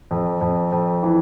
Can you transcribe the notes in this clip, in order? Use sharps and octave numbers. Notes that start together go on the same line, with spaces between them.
F2
F2
F2
E3